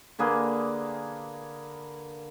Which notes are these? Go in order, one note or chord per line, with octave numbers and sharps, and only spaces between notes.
D3 A#3 G#4 B4